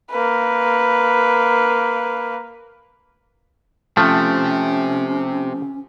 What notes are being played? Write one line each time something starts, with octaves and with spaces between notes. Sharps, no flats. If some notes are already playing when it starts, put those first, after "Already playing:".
A#3 B4
F3 A3 C4 C#4 G4